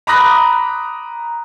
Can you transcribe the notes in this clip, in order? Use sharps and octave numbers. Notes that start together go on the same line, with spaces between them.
A#5 B5 D6 D#6 F#6 A#6